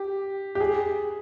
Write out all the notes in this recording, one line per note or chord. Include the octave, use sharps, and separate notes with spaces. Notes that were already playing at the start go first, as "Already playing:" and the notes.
Already playing: G4
G4
G#4